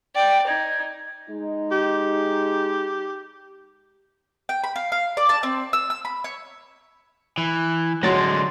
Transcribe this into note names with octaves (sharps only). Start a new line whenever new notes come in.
D5 G5
D#4 G#6
G#3 D#4
G4
G5
B5
F5
F5
D5
A5
C4
E6
E6
B5
C#5
E3
D3 F#3 G#3 C6 A6 A#6